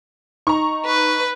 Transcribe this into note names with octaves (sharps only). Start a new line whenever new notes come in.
D#4 A#5 C#6
B4